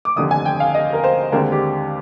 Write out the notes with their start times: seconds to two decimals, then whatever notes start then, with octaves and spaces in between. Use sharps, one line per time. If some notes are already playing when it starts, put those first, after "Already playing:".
0.05 D6
0.16 F1 D#2 D3 D#6
0.31 G#5
0.45 G5
0.60 F5
0.74 D#5
0.93 A#4
1.04 C5
1.32 D#2 D3 G#3 C4 A#4
1.52 G4